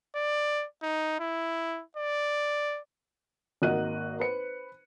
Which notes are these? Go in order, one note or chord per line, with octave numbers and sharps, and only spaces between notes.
D5
D#4
E4
D5
G#1 A#3 F#4 D#5 F#6 D#7
B4 C5 C#7